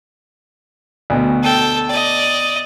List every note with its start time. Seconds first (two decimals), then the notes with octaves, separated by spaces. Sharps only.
1.10 D2 B2
1.43 A4 G5
1.89 D5 D#5